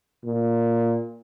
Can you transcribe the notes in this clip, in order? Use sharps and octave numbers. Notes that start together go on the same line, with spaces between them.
A#2